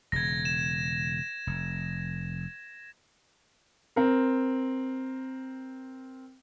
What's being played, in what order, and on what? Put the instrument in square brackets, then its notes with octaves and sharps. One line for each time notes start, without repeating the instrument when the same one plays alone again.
[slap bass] E1 C#3 [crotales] G#6 A#6
[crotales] E7
[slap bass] F1
[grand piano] C4 A#4